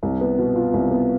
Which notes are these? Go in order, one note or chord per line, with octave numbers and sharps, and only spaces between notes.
C2
B3
B2
F4
C2
B3